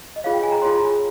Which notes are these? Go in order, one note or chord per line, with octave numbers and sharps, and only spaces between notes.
D#5
F4 G#4 C#5 F5
G5
G#5
A#5
F4 G#4 C#5 C6